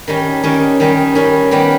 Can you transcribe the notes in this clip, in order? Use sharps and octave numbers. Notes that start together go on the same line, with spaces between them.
D#3 G3 C#4
D#3 G3 C#4
D#3 G3 C#4
D#3 G3 C#4
D#3 G3 B3 G4